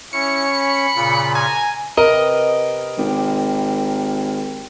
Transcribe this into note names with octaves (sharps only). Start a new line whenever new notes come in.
C#4 E4 C#5 C#7
B5
A#2 C#3 F4
G#5 A#5
C3 A#4 B4 D#5
G#1 G4